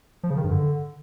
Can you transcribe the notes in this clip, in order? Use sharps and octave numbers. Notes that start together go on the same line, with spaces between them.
F3
C#3
D#3
G2
D3